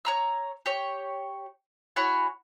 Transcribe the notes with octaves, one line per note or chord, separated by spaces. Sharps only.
C#5 A#5 E6
G4 C#5
E4 F#4 C#5 G#5